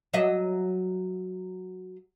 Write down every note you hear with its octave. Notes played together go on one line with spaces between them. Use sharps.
F#3 D#5 E5